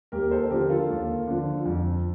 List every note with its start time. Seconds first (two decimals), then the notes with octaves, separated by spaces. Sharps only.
0.12 D#2 G4 A#4
0.31 A4 C5
0.50 D3 F3 G4 A#4
0.70 F4 A4
0.89 D#2
1.28 D3 F3
1.65 F2